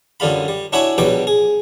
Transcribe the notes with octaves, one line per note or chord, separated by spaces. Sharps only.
F#2 D3 G3 F4 B5
G3
D4 E4 F#4 C#5 E5 G#5
A#1 B2 F#3 G3 G5 D6
G#4